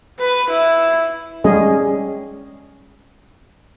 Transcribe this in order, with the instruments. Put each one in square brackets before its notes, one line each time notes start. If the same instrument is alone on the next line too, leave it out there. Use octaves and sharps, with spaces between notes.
[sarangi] B4
E4
[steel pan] G3 G#3 C#4 G#4 D#5